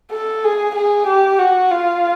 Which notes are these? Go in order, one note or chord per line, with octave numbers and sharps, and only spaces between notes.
A4
G#4
G#4
G4
F#4
F4